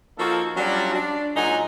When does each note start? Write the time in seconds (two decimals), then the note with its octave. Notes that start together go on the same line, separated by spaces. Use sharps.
0.19 F3 A#3 D#4 F#4 A4
0.57 F#3 G3 C#4 D4 F4 F#4
0.94 D4
1.36 A#2 F#3 G#3 D#4 F#5 G#5